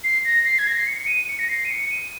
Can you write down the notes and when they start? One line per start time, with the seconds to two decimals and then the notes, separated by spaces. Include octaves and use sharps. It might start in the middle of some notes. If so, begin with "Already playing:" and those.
0.04 C7
0.25 A#6
0.44 C7
0.59 G#6
0.67 A#6
0.78 C7
0.87 C#7
1.01 C#7
1.07 D#7
1.28 C#7
1.39 A#6
1.49 C7
1.65 D#7
1.70 C#7
1.90 D#7